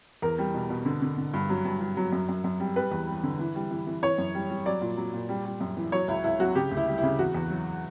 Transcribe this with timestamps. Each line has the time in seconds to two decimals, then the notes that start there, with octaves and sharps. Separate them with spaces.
0.22 E2 A#4
0.38 G3
0.54 B2
0.70 B2
0.86 D3
1.02 D3
1.18 D3
1.34 G2
1.49 F#3
1.65 G2
1.81 G2
1.97 F#3
2.12 F#2
2.29 F#2
2.44 F#2
2.60 G3
2.76 G3 B4
2.92 E2
3.07 G3
3.23 D3
3.39 E3
3.55 G3
3.71 E3
3.87 E3
4.02 E3 C#5
4.18 F#2
4.35 G3
4.50 G3
4.66 F#3 D5
4.81 A#2
4.97 F#3
5.13 A#2
5.29 G3
5.45 G3
5.61 F#2
5.77 E3
5.92 F#3 C#5
6.08 C#2 E4
6.24 C#2 E4
6.40 F#3 F#4
6.55 C#3 G4
6.71 D2
6.77 E4
6.88 G3
6.98 E4
7.03 C#3
7.19 E2 F#4
7.34 E2
7.50 F#3